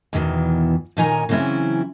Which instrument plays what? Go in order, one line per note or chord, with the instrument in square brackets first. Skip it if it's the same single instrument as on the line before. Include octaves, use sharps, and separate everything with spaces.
[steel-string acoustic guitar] E2 B2 D#3 E3
A#2 D#3 D#4 C#5 G#5 A#5
C#3 E3 F#3 C4 C#4 E4